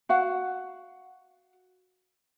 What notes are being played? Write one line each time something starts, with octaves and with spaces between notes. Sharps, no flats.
F#4 F5 F#5